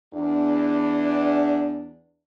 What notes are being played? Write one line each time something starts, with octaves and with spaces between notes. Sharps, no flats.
E2 D4